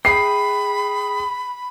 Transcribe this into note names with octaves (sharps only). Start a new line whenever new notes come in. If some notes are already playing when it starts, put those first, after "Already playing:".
G#4 E5 G5 B5 C7